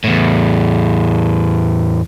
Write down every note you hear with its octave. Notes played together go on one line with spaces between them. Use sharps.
E2 A2